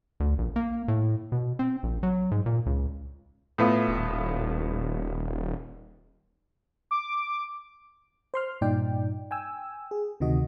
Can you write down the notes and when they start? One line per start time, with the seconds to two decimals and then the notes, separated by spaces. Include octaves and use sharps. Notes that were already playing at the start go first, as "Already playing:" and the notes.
0.20 D2
0.38 A#1
0.56 A#3
0.88 A2
1.32 B2
1.59 C4
1.83 A#1
2.03 F#3
2.31 G#2
2.46 A#2
2.66 C#2
3.58 A2 B3 F4
3.88 D#1
6.91 D6
8.34 C5 C6 F6
8.61 G2 A#2 D#4 D5 G5
9.31 G5 G#5 E6
9.91 G#4
10.20 D2 C3 D#3 F#4 D#5